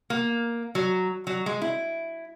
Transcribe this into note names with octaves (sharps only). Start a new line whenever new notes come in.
A#3
F#3
F#3
G#3
E4